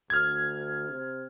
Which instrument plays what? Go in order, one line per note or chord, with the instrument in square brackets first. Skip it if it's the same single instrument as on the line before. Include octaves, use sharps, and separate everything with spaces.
[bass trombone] D2 [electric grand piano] F6 G#6
[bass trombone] C3